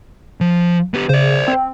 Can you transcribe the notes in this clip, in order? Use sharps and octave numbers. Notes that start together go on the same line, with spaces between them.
F3
B3 G4
C#3 C5 D5
C4